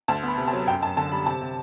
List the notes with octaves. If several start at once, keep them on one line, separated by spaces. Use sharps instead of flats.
D2 A5
B3 B5
C3
A5
F#3
F#2 G5
F#2 A5
D3 A5
G3 B5
C3 A5
C3